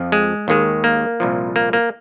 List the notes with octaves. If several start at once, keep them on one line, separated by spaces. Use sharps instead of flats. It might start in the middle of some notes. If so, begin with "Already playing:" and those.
Already playing: F2 F3
G#3
D#2 D#3 G#3
A#3
C2 A#2 F3
A#3
A#3